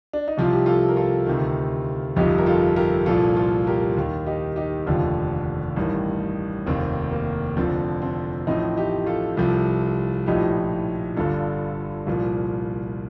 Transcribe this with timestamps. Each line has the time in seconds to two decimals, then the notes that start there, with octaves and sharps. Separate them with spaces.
0.13 D4
0.28 D#4
0.37 C2 C3 F3 F4
0.53 G4
0.66 F4 A4
0.89 A#4
0.96 F4 A4
1.26 D2 C3 D#3
2.16 G1 F2 C3 F3 D#4 G4
2.38 A#4
2.46 F4 A4
2.76 G4 A#4
3.06 C2 A#2 F3 F4 A4
3.37 F4 A4
3.67 G4 A#4
3.97 D#2 D#3
4.26 D#4 G4
4.56 D#4 G4
4.86 F1 D#2 D3 F3
5.76 A1 G2 D#3
6.66 F1 D#2 D#3 C4
7.11 A#3
7.57 F1 F2 D3 F3 C4
8.02 C4
8.47 A1 A2 F3 C4 D#4
8.77 D#4 G4
9.06 F4 A4
9.37 C2 C3 F3
10.26 A#1 A2 F3 D#4 G4
11.17 G1 G2 D3 F4 A4
12.06 C2 A#2 F3